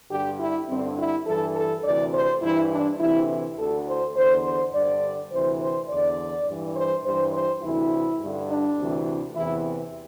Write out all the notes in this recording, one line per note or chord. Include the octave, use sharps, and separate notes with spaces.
G2 D3 G4
E4
G2 D3 C4
E4
G2 E3 A4
A4
D2 C3 E3 D5
C5
G2 E3 E4
D4
D2 C3 E3 E4
D2 D3 A4
C5
E2 D3 C5
C5
G2 D3 D5
D2 C3 E3 C5
C5
E2 D3 D5
G2 E3
C5
G2 E3 C5
C5
D2 C3 E3 E4
G2 D3
D4
D2 C3 E3
E2 C3 E3 E4